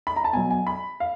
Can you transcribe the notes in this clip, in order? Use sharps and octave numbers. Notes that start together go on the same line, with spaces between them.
B5
A#5
A5
B2 F#3 G#5
G#5
B5
F5